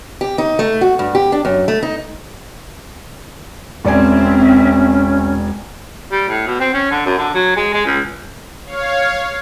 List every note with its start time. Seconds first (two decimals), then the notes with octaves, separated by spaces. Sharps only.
0.21 G4
0.38 D#4
0.59 A3
0.81 F#4
0.99 G2
1.15 G4
1.32 D4
1.45 F#2
1.68 A3
1.83 D#4
3.85 E1 C4 C#4 D5 E5 G#5
6.12 G3
6.28 A2
6.47 B2
6.60 C4
6.73 C#4
6.91 D3
7.06 F#2
7.18 D3
7.34 F#3
7.56 G#3
7.73 G#3
7.86 C#2
8.65 C#5 F5